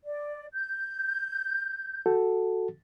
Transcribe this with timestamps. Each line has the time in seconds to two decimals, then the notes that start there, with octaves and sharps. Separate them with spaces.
0.05 D5
0.54 G6
2.06 F#4 A4